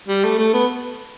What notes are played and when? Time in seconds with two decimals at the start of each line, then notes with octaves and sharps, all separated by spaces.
0.08 G3
0.24 A3
0.39 A3
0.53 B3